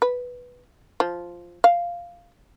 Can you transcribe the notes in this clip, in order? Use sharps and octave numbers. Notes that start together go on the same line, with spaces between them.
B4
F3
F5